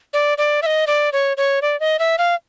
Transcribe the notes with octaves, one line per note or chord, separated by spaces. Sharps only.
D5
D5
E5
D#5
D5
C#5
C#5
D5
D#5
E5
F5